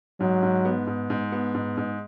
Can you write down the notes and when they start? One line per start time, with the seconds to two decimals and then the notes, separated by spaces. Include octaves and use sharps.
0.20 G#2 F#3
0.43 G#2
0.65 B3
0.87 G#2
1.10 G#2
1.32 B3
1.54 G#2
1.77 G#2